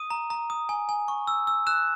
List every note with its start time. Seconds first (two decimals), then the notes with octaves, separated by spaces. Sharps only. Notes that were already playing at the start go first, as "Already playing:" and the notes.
Already playing: D#6 D#7
0.10 A#5
0.30 A#5
0.50 D#6
0.69 G#5
0.89 G#5
1.08 C#6
1.27 E6
1.47 E6
1.67 E6 F#6 E7